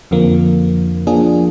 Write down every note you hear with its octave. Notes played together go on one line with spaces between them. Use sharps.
F2 D3 F3 A#3
F3 A#3 D4 G#4